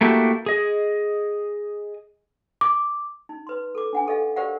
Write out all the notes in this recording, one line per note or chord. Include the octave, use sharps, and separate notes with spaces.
A3 A#3 E4 F#4 G4
G#4 D#5
D6
D#4
B4 C6
A4 D6
D4 F#5 G#5
G4 A4 D#5 F5
G4 A#4 C5 D5 F5 F#5